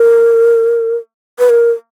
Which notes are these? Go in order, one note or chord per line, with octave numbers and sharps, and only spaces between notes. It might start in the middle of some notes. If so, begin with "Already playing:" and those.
Already playing: A#4
B4
A#4